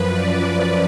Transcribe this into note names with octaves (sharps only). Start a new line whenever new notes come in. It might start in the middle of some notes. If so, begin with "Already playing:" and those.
Already playing: F#2 F3 B4
D5